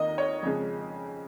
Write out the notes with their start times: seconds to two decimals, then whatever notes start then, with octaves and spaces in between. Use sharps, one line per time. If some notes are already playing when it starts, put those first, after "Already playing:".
Already playing: D#2 D#3 A#3 D#5
0.18 C#5
0.43 F2 C#3 G#3